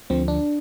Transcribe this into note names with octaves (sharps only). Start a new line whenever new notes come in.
D2 D3 F3 C4
D4